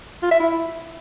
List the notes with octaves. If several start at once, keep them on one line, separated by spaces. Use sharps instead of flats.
F4
E5
E4